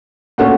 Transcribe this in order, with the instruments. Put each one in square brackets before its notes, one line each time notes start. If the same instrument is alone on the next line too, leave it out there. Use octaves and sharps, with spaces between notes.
[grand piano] A#2 A3 C#4 F#4